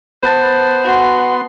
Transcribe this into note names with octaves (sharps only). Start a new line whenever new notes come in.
B3 B4 C5 A5
F#4 C6